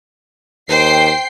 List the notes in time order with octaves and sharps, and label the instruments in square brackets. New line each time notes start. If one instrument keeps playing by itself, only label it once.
[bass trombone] D#2 [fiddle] C5 [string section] G5 C7